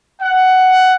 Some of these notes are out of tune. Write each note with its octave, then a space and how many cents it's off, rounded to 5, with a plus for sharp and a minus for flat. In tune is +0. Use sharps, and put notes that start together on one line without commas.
F#5 +10